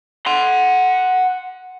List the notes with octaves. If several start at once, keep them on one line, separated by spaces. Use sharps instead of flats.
F#5 C6